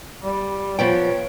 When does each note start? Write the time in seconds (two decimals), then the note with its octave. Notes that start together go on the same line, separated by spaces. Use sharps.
0.23 G3
0.79 F3 B3 C#5 G5